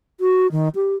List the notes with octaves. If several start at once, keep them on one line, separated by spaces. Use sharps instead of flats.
F#4
D#3
G4